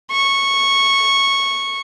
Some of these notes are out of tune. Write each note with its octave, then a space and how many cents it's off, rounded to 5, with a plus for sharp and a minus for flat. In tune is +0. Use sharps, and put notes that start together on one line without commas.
C#6 -10